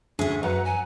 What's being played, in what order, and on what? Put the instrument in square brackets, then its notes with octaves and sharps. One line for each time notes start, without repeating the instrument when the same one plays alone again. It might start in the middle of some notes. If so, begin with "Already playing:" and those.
[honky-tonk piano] D2 [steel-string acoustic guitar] C#4 G#4 [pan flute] E5
[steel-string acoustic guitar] F#2 [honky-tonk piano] F#3 F#5 A#5 [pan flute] B4
[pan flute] G#5